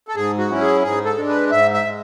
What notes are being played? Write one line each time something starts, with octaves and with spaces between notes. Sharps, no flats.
A4
G#2 G#4
F#4
F#3 C#4 E4
G#4
G#2 G#4
A4
G#3 D4
B4
G#2 E5
E5
G#3